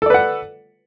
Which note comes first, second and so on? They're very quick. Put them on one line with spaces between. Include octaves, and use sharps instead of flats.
A4 D5 B4 F#5